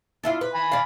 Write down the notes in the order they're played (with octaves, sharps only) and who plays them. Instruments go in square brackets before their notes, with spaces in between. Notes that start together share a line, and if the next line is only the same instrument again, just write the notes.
[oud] D4 E4 F4
B4
[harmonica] G#5 B5
[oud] D5 F5